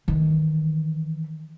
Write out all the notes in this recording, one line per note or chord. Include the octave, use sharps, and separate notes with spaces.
D#3 E3